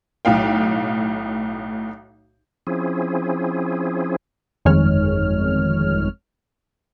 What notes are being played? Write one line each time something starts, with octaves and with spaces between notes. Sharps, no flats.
B1 A2 F5 G5
F3 C4 C#4 E4 G#4
G1 F2 D#3 G#3 C#5 F6